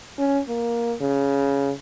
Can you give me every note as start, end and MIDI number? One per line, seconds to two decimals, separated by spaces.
0.19 0.39 61
0.49 0.93 58
1.01 1.71 49